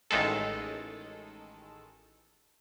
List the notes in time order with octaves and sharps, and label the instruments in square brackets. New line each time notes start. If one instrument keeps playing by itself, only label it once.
[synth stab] A1 D#3 G#3 A4